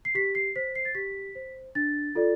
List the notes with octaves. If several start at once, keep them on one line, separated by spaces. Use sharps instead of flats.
C7
G4 B6
C7
C5 B6
C7
A6
G4 B6
C5
D4 A6
F4 A4 D5